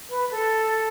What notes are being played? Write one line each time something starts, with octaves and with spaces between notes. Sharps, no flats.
B4
A4